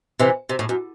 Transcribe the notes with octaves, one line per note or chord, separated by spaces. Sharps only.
C3 E3
C3
A2
F#2